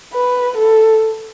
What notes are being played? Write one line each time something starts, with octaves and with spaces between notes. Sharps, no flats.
B4
A4